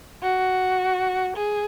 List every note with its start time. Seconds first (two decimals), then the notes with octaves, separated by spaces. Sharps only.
0.21 F#4
1.36 G#4